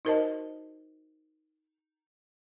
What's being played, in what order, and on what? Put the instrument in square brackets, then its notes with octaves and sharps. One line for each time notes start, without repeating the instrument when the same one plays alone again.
[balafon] D#4 F#4 A#4 C5 D#5 A5